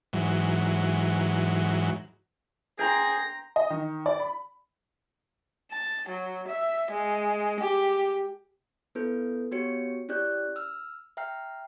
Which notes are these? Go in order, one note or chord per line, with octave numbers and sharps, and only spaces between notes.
G#2 E3 F#3
G#4 G5 A#5 C6 A#6
D#5
D#3
D5
B5
A5
F#3
E5
G#3
G4
B3 E4 A4 B4 G6
B3 F#4 G4 C#5 C#7
C#4 E4 G4 D5 F#6 G6
E6 F6
E5 G5 A#5 F6 C7